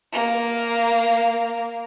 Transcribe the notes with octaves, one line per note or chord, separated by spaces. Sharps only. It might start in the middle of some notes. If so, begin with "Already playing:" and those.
A#3 F5